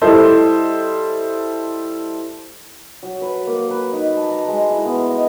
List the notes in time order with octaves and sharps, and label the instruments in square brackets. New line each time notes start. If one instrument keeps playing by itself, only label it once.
[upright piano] G3 E4 A4 C5 D#5
[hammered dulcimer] F#3
B4
A#3
B4
D#4
A5
A#5
G#3
E4
B3
D#5